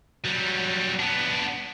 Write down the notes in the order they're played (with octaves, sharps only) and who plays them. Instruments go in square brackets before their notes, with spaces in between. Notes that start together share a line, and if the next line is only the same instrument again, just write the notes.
[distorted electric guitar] F#3 G3
B3 D4